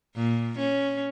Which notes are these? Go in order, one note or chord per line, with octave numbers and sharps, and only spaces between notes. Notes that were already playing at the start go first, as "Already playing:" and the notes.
A#2
C#4